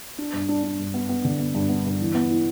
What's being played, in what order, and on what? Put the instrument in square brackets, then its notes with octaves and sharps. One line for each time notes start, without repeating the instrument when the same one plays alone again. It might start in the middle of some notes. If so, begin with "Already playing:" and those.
[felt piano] D4
G2
D4
D4
G2
B3
B3
D3
B3
G2
B3
G2
E3
B3
E4